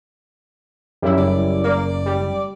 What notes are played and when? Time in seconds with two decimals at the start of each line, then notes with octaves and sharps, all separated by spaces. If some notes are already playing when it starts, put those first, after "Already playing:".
1.02 F#2 G3 E4
1.18 F#1 D5
1.64 A#3 D5
2.06 G3